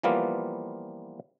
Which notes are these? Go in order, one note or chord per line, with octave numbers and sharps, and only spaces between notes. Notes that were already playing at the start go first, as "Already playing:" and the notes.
E3 F3 G3 A#3 B3 F4